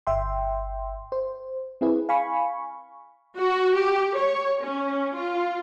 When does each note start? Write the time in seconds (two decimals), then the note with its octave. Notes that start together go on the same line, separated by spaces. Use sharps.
0.07 G1 E5 G5 C6
1.12 C5
1.81 C4 E4 G#4 B4
2.09 F5 G#5 B5 C#6
3.39 F#4
3.77 G4
4.18 C#5
4.64 C#4
5.17 F4